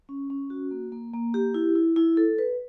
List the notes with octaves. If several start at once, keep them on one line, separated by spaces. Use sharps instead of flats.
C#4
C#4
F#4
A#3
A#3
A#3
G4
E4
E4
E4
A4
B4